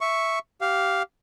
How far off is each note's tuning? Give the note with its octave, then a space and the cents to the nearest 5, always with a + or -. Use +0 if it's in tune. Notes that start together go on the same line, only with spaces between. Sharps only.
E5 +0 C#6 +0
G4 -15 F5 +0